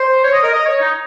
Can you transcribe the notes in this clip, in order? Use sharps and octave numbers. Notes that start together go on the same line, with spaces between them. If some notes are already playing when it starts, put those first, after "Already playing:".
Already playing: C5
C#5
D#5
A#4
D#5
C#5
D#4